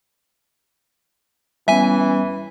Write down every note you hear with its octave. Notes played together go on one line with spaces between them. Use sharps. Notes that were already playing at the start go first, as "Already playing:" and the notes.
E3 G3 B3 C#4 E5 G#5